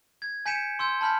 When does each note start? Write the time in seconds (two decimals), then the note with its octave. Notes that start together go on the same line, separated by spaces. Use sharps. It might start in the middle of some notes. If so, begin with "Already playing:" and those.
0.22 G#6
0.46 G#5 G6 B6 C#7 D7 E7
0.79 C6 E6 G6
1.01 A5 B5 F6 G6 B6